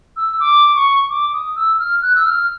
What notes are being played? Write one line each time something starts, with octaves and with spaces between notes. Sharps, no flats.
E6
D6
C#6
D6
D#6
E6
F6
F#6
E6
F6